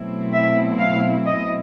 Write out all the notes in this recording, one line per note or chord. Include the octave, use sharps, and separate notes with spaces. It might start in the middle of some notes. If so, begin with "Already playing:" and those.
Already playing: B2 F#3 A3 C4 E4
E5
F5
D#5